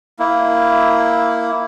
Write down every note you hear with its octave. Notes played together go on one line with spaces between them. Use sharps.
A#3 E4